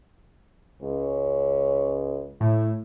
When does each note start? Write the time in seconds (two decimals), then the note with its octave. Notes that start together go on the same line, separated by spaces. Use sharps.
0.82 C#2 C#4
2.41 A2 E4